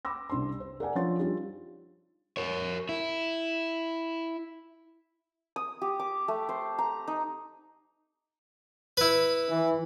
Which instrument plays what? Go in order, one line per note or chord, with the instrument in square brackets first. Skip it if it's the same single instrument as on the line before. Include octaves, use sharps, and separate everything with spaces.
[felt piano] B5 D6 E6 A#6
C2 D4 C5 C6
C5
A#4 D5 F#5 G#5
F3 D4 C5 C#5 C6 A6
G3 D4 D#4 F4 G4
[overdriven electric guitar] A#4 C#5
E4
[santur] D#6
G4
D6
A3
C5
A#5
D#4
[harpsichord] E4 B4
[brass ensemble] E3